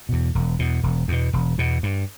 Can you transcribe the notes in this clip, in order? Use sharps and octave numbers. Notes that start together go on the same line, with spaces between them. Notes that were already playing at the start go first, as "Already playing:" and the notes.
E2 B2
E1
E2 B2
E1
E2 B2
E1
E2 B2
G2